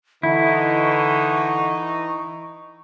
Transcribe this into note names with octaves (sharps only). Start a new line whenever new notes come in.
D3 E3 D#4 E4 C#6